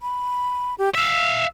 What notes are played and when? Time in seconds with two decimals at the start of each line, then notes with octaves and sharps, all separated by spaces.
0.02 B5
0.78 G4
0.95 E5 F5 E6